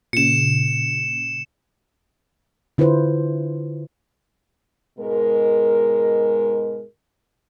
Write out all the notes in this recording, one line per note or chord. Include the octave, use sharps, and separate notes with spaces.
A#2 C#3 C#7 E7
D3 E4 F4 B4 C5
G#2 B2 G#3 A#4